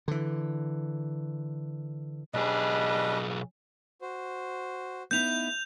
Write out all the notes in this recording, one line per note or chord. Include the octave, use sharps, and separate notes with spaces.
D3 E3
B1 G3 D4 G#4 B4 D#5
F#4 C5
B3 D#4 E4 G6 F7